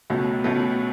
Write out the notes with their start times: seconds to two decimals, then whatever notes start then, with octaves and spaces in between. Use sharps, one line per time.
0.10 C#2 B2 F#3 A3
0.44 C#2 B2 F#3 A3